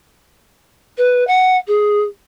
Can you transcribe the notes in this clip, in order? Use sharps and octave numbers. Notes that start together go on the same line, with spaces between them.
B4
F#5
G#4